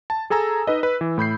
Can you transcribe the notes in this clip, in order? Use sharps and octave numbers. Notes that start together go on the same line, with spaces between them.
A5
G#4 A4 G#5 A#5 E6
D#4 B4 D#5
B4
E3
A2 B5 G6 C7